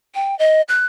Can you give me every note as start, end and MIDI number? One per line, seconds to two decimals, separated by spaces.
0.15 0.37 79
0.39 0.62 75
0.69 0.86 90